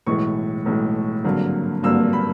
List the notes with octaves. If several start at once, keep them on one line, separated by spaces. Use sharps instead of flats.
B1 A2 E3 G#3 C#6
B1 A2 E3 G#3
G#1 G2 D3 F#3 A#3
G#1 G2 D3 F#3 A#3 E6
B5